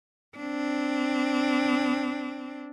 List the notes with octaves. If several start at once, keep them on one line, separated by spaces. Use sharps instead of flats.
C4 D4